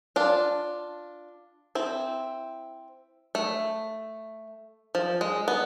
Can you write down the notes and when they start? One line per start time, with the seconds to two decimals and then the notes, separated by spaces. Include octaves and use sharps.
0.16 D4 F4
1.75 C4 E4
3.35 A3
4.95 F3
5.21 G#3
5.48 B3